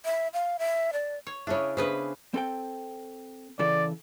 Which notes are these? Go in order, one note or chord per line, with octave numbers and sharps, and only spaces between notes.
E5
F5
E5
D5
C#5
C#3 D4 E4 G#4 C#5
C#3 B3 D4 G#4 B4 C5
C4 A4 G5
C#3 E3 A4 D5